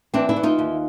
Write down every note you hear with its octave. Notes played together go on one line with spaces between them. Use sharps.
E3 C4 D4
D4 E4
E3
D#4 F4
D#2